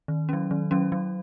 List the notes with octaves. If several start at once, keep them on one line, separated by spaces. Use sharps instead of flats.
D#3
F#3 C#4
D#3
F#3 C#4
F#3